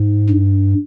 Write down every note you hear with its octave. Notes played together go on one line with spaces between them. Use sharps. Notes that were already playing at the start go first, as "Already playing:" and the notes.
Already playing: G#2
G2